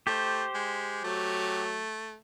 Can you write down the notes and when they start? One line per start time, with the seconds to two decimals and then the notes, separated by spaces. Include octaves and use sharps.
0.07 A3 G4 C5
0.54 G#3
1.04 F#3 A3